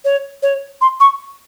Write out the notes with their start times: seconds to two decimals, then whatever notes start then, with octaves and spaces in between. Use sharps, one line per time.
0.05 C#5
0.43 C#5
0.81 C6
1.00 C#6